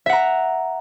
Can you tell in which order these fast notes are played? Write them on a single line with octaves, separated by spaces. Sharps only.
E5 F#5 A#5